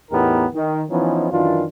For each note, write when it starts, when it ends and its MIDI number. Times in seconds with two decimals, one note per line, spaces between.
0.12 0.46 40
0.12 0.46 45
0.12 0.46 59
0.12 0.46 63
0.12 0.46 67
0.12 0.46 70
0.54 0.83 51
0.90 1.30 52
0.90 1.30 53
0.90 1.30 59
0.90 1.30 61
0.90 1.30 63
1.32 1.65 42
1.32 1.65 51
1.32 1.65 52
1.32 1.65 62
1.32 1.65 65